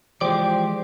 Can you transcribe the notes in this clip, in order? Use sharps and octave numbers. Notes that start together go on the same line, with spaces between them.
E3 F3 G#3 G4 C5 D5